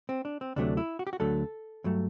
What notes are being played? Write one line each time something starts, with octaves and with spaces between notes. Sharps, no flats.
C4
D4
C4
D2 C3 F#3 A3 D4
E4
F#4
G4
F#4
D2 D3 F#3 A3 A4
G2 F#3 A3